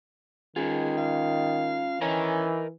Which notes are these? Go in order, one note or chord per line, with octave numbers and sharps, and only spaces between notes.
D#3 C#4 F4 G#4
F5
E3 C#4 A#4 D#5 A#5